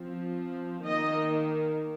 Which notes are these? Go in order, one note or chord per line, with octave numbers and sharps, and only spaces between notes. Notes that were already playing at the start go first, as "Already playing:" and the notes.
Already playing: F3 C4
D#3 A#3 D#5